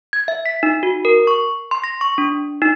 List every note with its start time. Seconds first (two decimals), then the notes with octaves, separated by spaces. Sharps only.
0.13 G#6
0.28 E5
0.46 B6
0.63 D#4
0.83 F#4
1.05 A#4
1.27 C#6
1.71 C6
1.84 A#6
2.01 C#6
2.18 D4
2.62 D#4